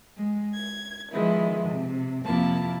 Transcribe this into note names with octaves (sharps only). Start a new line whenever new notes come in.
G#3
G#6
D#3 F3 G#3 B3 E4
C3
F2 C3 F3 A#3 E4 A5